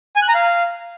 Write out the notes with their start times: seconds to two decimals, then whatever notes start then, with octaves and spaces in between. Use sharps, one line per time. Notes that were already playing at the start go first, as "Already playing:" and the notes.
0.16 G#5
0.22 F#6
0.29 A#5
0.35 F5